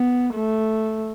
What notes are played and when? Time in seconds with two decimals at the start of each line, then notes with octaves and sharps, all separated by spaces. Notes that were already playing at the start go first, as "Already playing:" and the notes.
Already playing: B3
0.34 A3